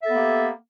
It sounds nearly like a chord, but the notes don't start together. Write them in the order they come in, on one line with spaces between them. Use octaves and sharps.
E5 A4 B3 A#3 G4